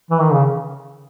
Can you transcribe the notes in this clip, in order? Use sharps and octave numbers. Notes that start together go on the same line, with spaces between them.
E3
D#3
C#3